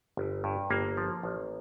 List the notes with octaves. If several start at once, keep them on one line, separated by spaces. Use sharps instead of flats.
G1
G2
G1 A#3
F3
A1